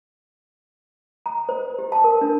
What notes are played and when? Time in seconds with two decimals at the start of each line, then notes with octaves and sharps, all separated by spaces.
1.26 A#5
1.49 C5
1.79 G4
1.92 A5
2.04 A#4
2.21 D4